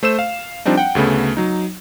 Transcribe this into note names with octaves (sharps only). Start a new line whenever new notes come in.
A3 C5 E6 E7
F5
F3 G3 C4 D4 D#4
F#5 G5
D2 C#3 A3 B3
F#3 D#4